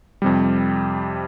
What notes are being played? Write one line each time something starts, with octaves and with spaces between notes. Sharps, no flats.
F2 C3 G3